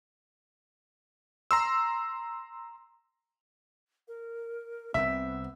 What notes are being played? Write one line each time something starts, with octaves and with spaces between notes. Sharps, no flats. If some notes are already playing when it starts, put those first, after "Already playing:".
A#5 C6 E6
A#4
C2 C3 B3 C4 E5